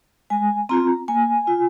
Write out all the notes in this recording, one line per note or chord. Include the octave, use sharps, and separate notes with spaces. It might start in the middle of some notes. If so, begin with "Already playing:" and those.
G#3 G#5
C4 F4 A#5
A#3 G#5
F4